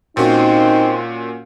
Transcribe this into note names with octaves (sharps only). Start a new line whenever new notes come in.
A#2 C4 C#4 D#4 F#4